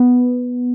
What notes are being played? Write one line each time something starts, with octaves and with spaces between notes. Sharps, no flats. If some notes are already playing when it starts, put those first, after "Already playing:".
Already playing: B3